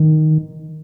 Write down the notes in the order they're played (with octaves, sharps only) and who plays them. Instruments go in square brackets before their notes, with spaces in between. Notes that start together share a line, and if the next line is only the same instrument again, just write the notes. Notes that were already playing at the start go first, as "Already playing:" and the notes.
Already playing: [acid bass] D#3